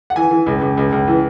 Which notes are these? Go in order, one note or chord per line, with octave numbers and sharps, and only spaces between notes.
F#5
E3 G#5
E3
C#2
C#2
C#2
C#2
E3